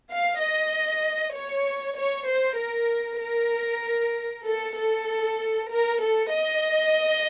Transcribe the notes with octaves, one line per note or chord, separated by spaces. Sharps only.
F5
D#5
C#5
C#5
C5
A#4
A#4
A4
A4
A#4
A4
D#5